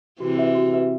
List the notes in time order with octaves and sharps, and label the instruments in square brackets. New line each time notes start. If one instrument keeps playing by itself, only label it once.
[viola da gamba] C3 E3 [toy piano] F#4
[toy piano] B4 E5
F#4
B4 E5